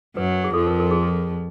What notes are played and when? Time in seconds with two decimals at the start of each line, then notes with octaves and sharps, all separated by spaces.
0.16 F#2 F#3 B4
0.44 G#4
0.53 F2 F3 A4
0.67 A#4
0.80 A#4
0.91 G#4